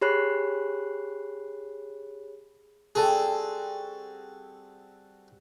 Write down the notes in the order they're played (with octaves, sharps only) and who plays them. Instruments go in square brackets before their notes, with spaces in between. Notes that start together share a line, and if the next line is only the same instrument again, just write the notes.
[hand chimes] G4 G#4 C#5 B5 F#6 C7
[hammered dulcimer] G3 C4 F#4 [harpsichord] G#4 A4